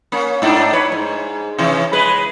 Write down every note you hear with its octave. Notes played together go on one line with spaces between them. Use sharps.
A#3 C#4
G#2 D4 D#4
B4 C#5
G#2
C3 E3 C#4
G#3 B4